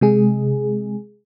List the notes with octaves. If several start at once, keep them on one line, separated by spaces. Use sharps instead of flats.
C3 G#3 G#4